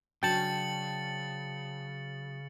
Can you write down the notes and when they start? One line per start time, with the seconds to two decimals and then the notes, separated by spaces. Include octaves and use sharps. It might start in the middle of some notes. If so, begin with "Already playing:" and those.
0.23 C#3 F#3 D4 G5 A5 A6 C#7 F#7